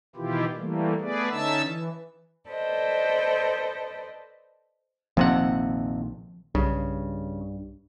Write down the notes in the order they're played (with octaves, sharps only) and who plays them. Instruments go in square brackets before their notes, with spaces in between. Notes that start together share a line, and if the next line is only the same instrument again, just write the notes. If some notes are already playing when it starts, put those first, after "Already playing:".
[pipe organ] B2 D#3 E3 E4 F4 G4
E3 G3 A3 A#3
A3 B3 G#4 B4 D5
D3 C#4 D#4 E5 A5 E6
E3
[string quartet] A4 B4 C5 D5 D#5
[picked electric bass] A#1 D#3 A#3 [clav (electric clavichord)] F2 C3 F#5 [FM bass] F3
[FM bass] B1 [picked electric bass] G2 [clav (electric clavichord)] C#3